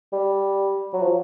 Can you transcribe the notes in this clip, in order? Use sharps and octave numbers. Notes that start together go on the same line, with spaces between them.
G3
F#3
F3